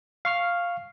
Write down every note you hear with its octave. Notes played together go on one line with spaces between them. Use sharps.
F5 C#6 F6